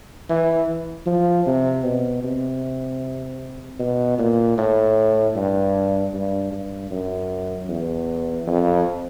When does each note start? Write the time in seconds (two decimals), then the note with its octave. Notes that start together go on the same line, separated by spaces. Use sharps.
0.29 E3
1.06 F3
1.46 C3
1.84 B2
2.24 C3
3.79 B2
4.19 A#2
4.58 A2
5.36 G2
6.14 G2
6.52 G2
6.91 F#2
7.69 E2
8.47 F2